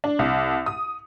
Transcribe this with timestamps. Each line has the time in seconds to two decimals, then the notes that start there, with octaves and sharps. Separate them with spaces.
0.04 D4
0.19 C2
0.66 D#6